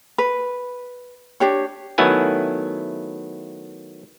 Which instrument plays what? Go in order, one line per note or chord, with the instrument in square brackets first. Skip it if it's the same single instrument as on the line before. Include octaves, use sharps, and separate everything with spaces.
[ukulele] B4
D4 G4 C#5
[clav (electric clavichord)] D#3 F#3 A3 B3 E4 G#5